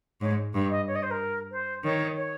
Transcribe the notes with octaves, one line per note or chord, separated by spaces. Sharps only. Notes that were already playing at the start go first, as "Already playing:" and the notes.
G#2 C#5
G2
D#5
C#5
D#5
C5
A#4
C5
D#3 C#5
C#5